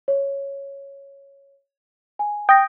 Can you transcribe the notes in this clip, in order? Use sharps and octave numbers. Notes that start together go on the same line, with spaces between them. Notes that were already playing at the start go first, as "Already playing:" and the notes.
C#5
G#5
G5 D#6 A#6